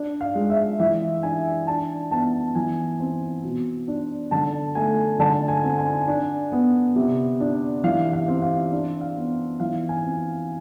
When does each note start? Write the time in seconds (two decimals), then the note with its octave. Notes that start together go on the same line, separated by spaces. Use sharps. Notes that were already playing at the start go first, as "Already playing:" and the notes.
Already playing: D4
0.21 F5
0.35 G#3
0.50 E5
0.79 E3 E5
1.23 D4 G#5
1.67 D4 A5
2.11 B3 A5
2.55 E3 G#5
3.00 C4
3.44 B2
3.88 D4
4.31 D3 A5
4.75 A3 G#5
5.19 D3 A5
5.48 G#5
5.63 C4
5.78 G#5
6.08 D4
6.52 B3
6.96 C3
7.40 D4
7.84 E3 F5
8.13 F5
8.28 C4
8.42 F5
8.72 D4
9.01 F5
9.16 B3
9.60 E3 F5
9.89 G#5
10.04 C4